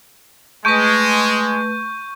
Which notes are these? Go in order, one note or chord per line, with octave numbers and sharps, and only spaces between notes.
G#3 A3 B4 C#6 G6